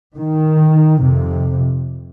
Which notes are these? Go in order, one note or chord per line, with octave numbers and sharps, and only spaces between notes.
D#3
F2 C3